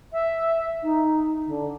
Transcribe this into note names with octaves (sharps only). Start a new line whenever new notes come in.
E5
D#4
D3